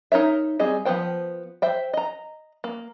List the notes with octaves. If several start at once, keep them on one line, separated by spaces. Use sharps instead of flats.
D#4 A#4 C#5 E5
G3 C4 G#4 D#5
F3 B3 E4 C5 G5
C5 E5 G5
D#5 A#5
A#3